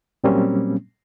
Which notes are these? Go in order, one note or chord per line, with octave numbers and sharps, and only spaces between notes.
A#2 F#3 G3 A#3 C4 C#4